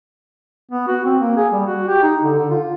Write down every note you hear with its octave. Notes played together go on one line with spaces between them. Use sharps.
B3
F#4
C4
A#3
G#4
G3
F#4
G4
D#4
D3
D3
F4